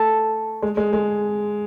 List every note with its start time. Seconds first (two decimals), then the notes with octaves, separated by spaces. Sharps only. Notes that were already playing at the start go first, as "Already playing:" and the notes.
Already playing: A3 A4
0.62 G#3
0.77 G#3
0.93 G#3